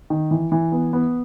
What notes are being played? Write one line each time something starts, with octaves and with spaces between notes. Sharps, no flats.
D#3
E3
E3
B3
B3